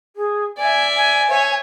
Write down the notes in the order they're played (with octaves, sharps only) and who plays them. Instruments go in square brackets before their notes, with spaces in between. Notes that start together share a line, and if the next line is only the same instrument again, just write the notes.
[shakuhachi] G#4
[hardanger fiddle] D5 E5 [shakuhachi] G#5
[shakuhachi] G#5
[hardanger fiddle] C#5 E5